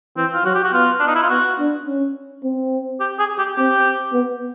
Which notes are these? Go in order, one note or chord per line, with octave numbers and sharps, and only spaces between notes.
E3 C4
F4
F#3 F#4
G4
F#4
B3 F4
D4
D#4
E4
F4
B3 F#4
D4
C#4
C4
G4
G#4
G4
C4 G4
B3